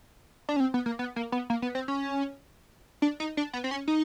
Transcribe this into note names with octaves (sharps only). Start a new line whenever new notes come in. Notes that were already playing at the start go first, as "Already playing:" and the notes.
D4
C#4
C4
B3
A#3
B3
A#3
B3
A#3
B3
C4
C#4
D4
D#4
D4
B3
C4
C#4
D#4